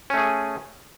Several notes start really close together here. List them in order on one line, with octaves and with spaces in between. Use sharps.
C#4 A3 G#4